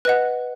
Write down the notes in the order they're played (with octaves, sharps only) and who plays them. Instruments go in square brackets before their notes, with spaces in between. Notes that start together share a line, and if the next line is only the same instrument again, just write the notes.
[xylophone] B4 D#5 F#5 F#6